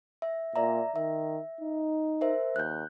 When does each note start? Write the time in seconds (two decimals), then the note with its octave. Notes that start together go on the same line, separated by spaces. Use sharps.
0.22 E5
0.56 A#2 D5 E5 A#5
0.96 D#3 E5
1.61 D#4
2.21 A#4 C5 E5
2.56 D#2 F#6 G6